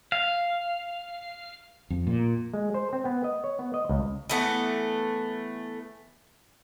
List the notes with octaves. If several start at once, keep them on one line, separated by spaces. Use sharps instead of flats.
F5
F2
A#2
G#3
C5
C4
B3
D#5
C#5
B3
D#5
C#2
E3 A3 B3